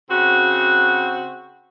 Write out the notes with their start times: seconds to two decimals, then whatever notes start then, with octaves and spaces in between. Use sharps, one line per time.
0.10 C#3 C4 F#4